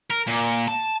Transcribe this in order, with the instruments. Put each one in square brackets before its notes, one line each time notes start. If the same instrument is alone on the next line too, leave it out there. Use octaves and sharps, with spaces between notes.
[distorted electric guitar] A#4
A#2
A5